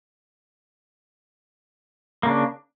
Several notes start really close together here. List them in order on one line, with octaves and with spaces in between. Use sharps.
A#3 C#3 D4